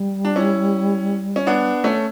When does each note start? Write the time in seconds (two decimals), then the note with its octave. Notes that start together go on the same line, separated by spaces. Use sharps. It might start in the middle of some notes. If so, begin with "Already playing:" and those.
Already playing: G3
0.25 D4
0.36 C#4 E4
1.36 C#4
1.47 B3 D4
1.84 A3 C#4